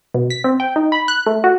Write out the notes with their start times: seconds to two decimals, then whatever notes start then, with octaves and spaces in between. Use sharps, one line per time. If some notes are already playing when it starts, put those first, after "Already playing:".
0.14 B2
0.30 B6
0.44 C4
0.60 G5
0.76 D#4
0.92 B5
1.08 F#6
1.26 A3
1.44 F#4